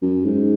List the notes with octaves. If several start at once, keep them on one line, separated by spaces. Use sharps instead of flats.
F#2
G#2